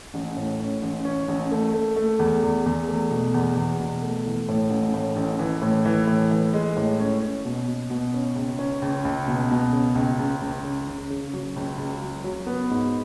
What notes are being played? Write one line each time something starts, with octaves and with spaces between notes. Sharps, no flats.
A1
A2
C#4
A1
C#4
A1
A3
A3
A3
E2
E2
E2
A3
B2
E2
E2
B2
A3
E3
A2
A1
A2
A1
E3
A2
E3
A2
E3
G#3
A2
C#4
C#4
B2
B2
B2
C#4
C#2
C#4
C#2
C#2
B2
B2
C#3
C#2
C#2
C#2
C#3
C#3
C#3
F#3
C#2
C#2
F#3
F#3
B3
G#2